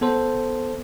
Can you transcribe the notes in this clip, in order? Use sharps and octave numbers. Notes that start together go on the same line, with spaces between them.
B3 A4 C5